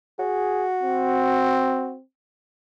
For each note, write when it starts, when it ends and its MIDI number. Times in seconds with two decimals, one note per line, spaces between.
0.19 1.93 66
0.19 0.67 68
0.83 2.02 60